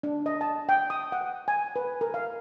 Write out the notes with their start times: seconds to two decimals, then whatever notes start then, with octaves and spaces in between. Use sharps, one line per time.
0.03 D4
0.26 D#5
0.41 A5
0.69 G5
0.90 D#6
1.12 F#5
1.48 G#5
1.76 B4
2.01 A#4
2.14 F5